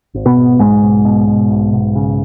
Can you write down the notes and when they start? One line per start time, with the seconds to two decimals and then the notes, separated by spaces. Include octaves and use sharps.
0.14 G#1
0.25 B2 B3
0.36 G#1
0.59 B1 G#2 G#3
0.82 B1
1.05 B2
1.28 B2
1.50 B1
1.73 B1
1.96 C#3